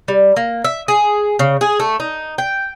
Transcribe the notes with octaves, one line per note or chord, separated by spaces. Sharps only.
G3
A#3
E5
G#4
C#3
G#4
A3
D#4
G5